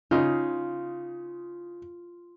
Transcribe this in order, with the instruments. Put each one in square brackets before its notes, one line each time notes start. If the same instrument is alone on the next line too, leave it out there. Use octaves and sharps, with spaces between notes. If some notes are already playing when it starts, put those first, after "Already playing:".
[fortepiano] C#3 D#4 [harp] F4